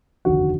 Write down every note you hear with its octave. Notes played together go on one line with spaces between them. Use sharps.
F1 D#2 D3 F#4